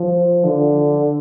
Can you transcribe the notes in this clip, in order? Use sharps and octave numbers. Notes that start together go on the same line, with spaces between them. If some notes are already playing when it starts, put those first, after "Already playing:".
Already playing: F3
D3